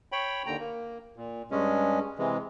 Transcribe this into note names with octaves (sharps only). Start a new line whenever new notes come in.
C#5 G5 B5
D#2 D3 G5 A#5
A#3
A#2
G2 G#3 C#4
C3 E3 G#3